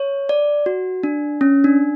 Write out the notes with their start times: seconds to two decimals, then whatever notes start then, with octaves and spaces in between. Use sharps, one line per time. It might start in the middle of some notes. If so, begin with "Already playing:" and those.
Already playing: C#5
0.29 D5
0.66 F#4
1.03 D4
1.41 C#4
1.64 D4